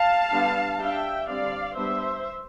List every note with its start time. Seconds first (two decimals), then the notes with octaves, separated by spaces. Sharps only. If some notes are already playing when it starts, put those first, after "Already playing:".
Already playing: F5 A5
0.32 D3 G3 B3 D4
0.79 G3 D4 E5 G5
1.27 D3 G3 C4 D5 F5
1.75 G3 B3 D4 C5 E5